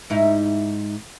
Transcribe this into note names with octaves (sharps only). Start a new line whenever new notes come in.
G#2 D#4 E4